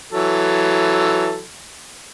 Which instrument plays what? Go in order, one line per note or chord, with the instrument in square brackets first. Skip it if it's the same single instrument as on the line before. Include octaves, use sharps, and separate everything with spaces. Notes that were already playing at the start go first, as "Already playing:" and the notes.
[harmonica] E3 F#3 A4